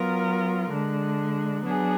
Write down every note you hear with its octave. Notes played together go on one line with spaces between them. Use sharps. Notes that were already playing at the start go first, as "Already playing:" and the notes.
Already playing: F#3 B3 F4 A#4
D3 G#3 D4
F#3 B3 D4 G#4